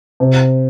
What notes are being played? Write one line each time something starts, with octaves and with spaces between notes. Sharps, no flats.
C3